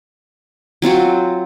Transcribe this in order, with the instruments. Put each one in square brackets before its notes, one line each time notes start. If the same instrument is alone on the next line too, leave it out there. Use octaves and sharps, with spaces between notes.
[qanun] F#3 C4 F4 F#4